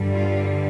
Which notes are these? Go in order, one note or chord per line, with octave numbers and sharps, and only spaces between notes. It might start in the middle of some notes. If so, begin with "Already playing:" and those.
Already playing: G2 D3 G3
F4